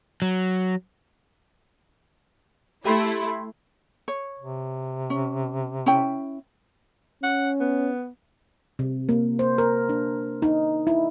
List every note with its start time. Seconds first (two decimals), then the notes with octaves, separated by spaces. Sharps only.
0.22 F#3
2.85 A3 E4 G4 B5 C6
4.08 C#5
4.39 C3
5.10 C#4
5.86 C#4 E4 G5
7.23 C#4 F#5
7.60 B3
8.79 C3
9.09 A#3
9.39 C5
9.58 A#4
9.89 D4
10.42 D#4
10.87 E4